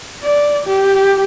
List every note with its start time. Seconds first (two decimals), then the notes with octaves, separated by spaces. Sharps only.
0.23 D5
0.67 G4